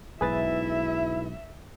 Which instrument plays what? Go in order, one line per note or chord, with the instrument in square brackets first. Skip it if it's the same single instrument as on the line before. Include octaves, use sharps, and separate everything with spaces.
[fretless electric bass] B1 G#2 [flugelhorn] E4 [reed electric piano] G#4 B4 A6 [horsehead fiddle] E5